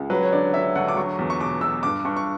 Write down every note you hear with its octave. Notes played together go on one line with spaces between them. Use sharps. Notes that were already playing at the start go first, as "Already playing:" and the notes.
Already playing: C#2
F#3 B4
C#5
D3 D5
D3 E5
D2 F#5
D6
F#3 C#6
E2
C#6
B2 D6
B2 E6
G2 D6
G2 C#6
C#6